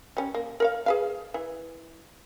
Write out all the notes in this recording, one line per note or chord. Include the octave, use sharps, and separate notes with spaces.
G3 C#4
A#3
A#4 C#5 F5
G#4 B4 F5
E3